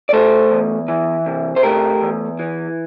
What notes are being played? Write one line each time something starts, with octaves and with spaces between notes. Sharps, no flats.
D5
A3 A4 C5
E2
E3
C3
C5
A3 G4 A#4
E2
E3